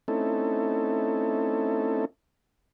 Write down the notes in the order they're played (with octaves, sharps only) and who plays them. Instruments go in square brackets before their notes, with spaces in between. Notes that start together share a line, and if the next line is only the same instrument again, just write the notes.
[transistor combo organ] A3 C4 C#4 D#4 E4 A4